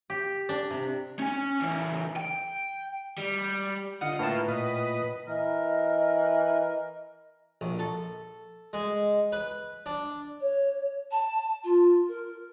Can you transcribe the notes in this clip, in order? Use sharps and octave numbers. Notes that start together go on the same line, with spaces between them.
G4
D4
C3
C#4 G#5
C#3 E3
G5
G3
D3 F4 D#5 F#5
A2 A#3 F4 B4 A5
A#2 B4 D#5
E3 A#4 D#5
A#1
A4
G#3
B4
D4
C#5
A5
F4
A#4